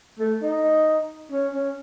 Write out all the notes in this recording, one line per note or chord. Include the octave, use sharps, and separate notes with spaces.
A3
D#4
C#4
C#4